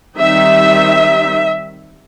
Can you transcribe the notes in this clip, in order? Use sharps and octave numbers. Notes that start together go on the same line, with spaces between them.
D#3 G3 C4 D#4 E5